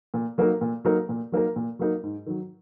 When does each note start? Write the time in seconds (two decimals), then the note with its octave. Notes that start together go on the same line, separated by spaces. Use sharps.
0.14 A#2
0.38 F#3 A#3 D#4 A#4
0.61 A#2
0.85 F#3 A#3 D#4 A#4
1.09 A#2
1.32 F#3 A#3 D#4 A#4
1.56 A#2
1.79 F#3 A#3 D#4 A#4
2.03 G#2
2.26 D#3 F#3